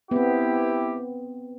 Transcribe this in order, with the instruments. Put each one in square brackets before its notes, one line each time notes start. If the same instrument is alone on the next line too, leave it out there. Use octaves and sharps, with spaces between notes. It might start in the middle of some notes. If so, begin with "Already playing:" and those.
[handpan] B3 C4 [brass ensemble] E4 G4